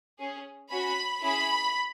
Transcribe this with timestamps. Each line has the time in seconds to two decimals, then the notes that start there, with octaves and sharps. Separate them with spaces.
0.18 C#4 G#4
0.70 C#4 F#4 B5
1.22 C#4 E4 G#4 B5